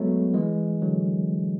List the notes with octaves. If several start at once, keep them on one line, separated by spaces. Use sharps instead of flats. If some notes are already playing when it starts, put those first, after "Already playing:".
Already playing: F#3 G#3 A3 B3
E3 G#3
D3 F#3